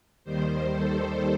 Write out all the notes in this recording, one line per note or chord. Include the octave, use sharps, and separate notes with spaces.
D#2 D#3 G3 C5
A4